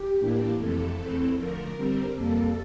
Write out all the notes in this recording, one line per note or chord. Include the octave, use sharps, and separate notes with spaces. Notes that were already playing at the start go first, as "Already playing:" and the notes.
Already playing: G4
A2 E3 A#3 D4
F2 C3 E3 A3 A4
E2 E3 A3 C4
D3 F3 A3 A#4
D3 G3 C4
F2 C3 G3 A#3 A4